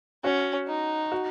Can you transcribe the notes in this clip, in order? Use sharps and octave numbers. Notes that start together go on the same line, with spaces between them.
C#4 F#4
D#4
F#4